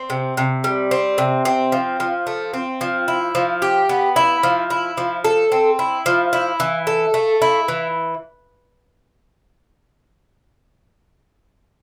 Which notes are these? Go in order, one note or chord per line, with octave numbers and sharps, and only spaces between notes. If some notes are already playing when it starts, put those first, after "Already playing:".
Already playing: C4
C3
C3
G3
C4
C3
C4
F3
F3
A3
C4
F3
E4
F3
G4
B3
E4
F3
E4
F3
A4
C4
E4
F3
E4
E3
A4
A3
E4
E3